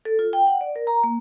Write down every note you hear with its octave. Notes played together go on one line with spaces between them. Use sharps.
A4
F4
G5
F#5
D5
A#4
A#5
A#3